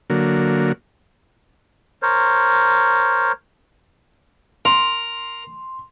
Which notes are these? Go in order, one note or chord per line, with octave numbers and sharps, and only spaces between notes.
D3 F#3 A#3
A#4 C5 C#5
A#4 C6